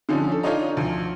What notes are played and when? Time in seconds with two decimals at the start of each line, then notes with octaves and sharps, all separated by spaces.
0.09 D3 F3 C#4 D#4
0.32 A4
0.43 D4 D#4 F4 C#5 D#5 A#5
0.77 D2 F3